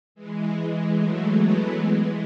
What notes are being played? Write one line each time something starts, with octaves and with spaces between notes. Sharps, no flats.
E3 G#3
F#3 A3
G#3 B3
E3 G#3